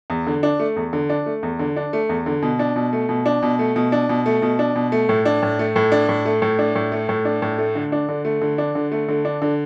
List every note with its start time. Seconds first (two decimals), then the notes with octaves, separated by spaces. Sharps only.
0.10 E2
0.27 D3
0.43 D4
0.59 A3
0.76 E2
0.93 D3
1.09 D4
1.26 A3
1.43 E2
1.59 D3
1.76 D4
1.93 A3
2.09 E2
2.26 D3
2.42 B2
2.59 D4
2.76 B2
2.93 A3
3.09 B2
3.26 D4
3.42 B2
3.59 A3
3.76 B2
3.92 D4
4.09 B2
4.26 A3
4.42 B2
4.59 D4
4.75 B2
4.92 A3
5.09 A2
5.25 D4
5.42 A2
5.59 A3
5.76 A2
5.92 D4
6.09 A2
6.25 A3
6.42 A2
6.59 D4
6.75 A2
6.92 A3
7.09 A2
7.25 D4
7.42 A2
7.58 A3
7.75 D3
7.92 D4
8.09 D3
8.25 A3
8.41 D3
8.58 D4
8.75 D3
8.92 A3
9.08 D3
9.25 D4
9.42 D3